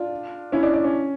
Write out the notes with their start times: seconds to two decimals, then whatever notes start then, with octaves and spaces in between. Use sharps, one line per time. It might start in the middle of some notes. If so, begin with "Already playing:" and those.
Already playing: D4 F4
0.52 C#4 E4
0.63 D4
0.74 D4
0.84 C#4